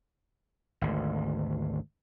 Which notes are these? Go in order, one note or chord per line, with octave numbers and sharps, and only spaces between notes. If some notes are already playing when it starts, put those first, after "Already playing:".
G#1 D2